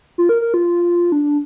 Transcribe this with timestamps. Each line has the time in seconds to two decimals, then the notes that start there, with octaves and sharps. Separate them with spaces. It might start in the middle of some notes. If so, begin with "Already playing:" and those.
0.18 F4
0.29 A#4
0.41 A#4
0.54 F4
1.12 D4